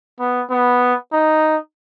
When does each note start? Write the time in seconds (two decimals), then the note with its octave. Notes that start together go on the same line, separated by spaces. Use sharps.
0.19 B3
0.50 B3
1.12 D#4